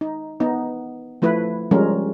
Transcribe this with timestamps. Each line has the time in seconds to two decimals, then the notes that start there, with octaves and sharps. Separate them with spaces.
0.01 D#4
0.40 B3 D#4
1.22 F3 A3 E4 B4
1.71 F3 G3 G#3 C#4 A#4